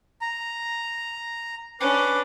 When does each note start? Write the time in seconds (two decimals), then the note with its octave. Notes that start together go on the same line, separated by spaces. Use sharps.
0.21 A#5
1.81 C#4 D4 B4 D6